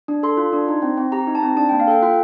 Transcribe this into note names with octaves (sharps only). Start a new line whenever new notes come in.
D4
A4 C6
F4
D4
D#4
C4
C4
G4 A#5
D#4
A5
C4
D4 A5
A#3 G5
F5
A4 G5
F4 G5